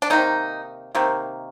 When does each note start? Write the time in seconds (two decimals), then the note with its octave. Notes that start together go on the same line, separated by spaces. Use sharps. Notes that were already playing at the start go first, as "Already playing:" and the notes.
0.02 D4
0.10 C3 D#3 A#3 D#4
0.95 C3 D#3 A#3